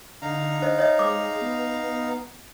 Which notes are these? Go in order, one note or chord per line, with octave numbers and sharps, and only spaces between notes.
D3 D#4 F5 A#5
C5 D#5
C#5 D#5 E5
G#3 D6
B3